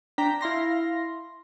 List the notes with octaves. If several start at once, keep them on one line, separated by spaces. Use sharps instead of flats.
D4 G5 A#5 B6
E4 F5 C6 A#6